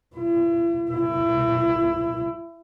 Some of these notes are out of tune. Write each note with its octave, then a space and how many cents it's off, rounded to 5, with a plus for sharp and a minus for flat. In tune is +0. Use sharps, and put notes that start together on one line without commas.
E4 +40
E4 +25